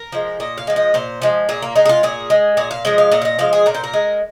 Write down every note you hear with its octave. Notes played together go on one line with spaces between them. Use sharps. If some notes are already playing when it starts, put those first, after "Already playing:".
Already playing: A#4
F3 G#3
A#2 D#5
F5
F3 G#3
D#5
A#2 C5
F3 G#3
A#2 G#4
A#3
G#3 D#4
G#4
F4
A#2 G#4
G#3
A#2 G#4
F5
F3 G#3 D#5
F5
A#2 D#5
F5
D#5
F3 G#3 F5
G#4
A#2 A#4
C5
A#4
G#3